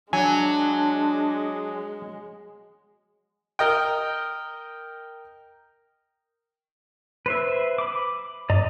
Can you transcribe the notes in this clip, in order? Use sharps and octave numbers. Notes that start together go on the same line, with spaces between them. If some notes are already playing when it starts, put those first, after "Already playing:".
F#3 G#3 D4 G#5
A#4 D#5 G5
B4 C5 E5
B5 D6
G2 D5 D#5 A#5